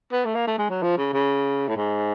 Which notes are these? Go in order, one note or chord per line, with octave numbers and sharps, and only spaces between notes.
B3
A3
A#3
A3
G#3
F#3
F3
C#3
C#3
A2
G#2